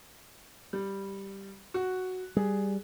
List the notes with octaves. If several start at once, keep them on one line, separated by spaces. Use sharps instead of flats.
G3
F#4
G3 G#4